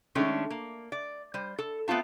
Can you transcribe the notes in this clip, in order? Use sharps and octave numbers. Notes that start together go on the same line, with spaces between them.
D#3 G#3 A3 C#4 D4
A#3
D5
G3 C5
A4
A3 B3 C4 F4 A5